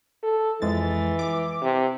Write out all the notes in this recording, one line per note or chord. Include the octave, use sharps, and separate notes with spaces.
A4
F2 E3 G#3 A6
D6
C3